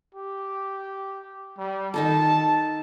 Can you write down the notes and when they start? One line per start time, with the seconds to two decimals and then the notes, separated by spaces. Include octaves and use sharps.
0.15 G4
1.58 G3
1.94 D#3 D#4 A4 A5